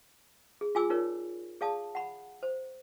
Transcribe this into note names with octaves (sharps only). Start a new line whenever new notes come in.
G#4
F4 G#4 G#5 D6 E6
D#4 F4 A#4 C#5 D5
G#4 D5 F5 A5 D#6
F#5 A#5 B5
C5